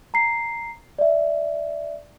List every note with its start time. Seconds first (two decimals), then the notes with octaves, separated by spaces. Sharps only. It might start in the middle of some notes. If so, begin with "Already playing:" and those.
0.14 A#5 C7
0.99 D5 E5